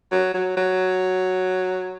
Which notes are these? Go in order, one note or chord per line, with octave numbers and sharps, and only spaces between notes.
F#3
F#3
F#3